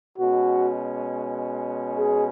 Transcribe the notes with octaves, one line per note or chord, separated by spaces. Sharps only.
B2 G#3 C#4 F#4
G#4